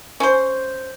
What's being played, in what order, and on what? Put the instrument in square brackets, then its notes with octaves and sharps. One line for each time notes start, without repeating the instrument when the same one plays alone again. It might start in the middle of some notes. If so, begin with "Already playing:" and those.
[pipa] C#4 C5